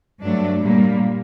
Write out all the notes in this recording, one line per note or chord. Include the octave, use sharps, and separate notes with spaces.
G2 F#3 A3 D4
A#2 G3 A#3